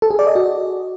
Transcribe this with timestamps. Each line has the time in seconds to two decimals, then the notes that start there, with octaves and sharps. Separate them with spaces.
0.02 A4
0.11 G#4
0.19 D5
0.27 D#5
0.35 F#4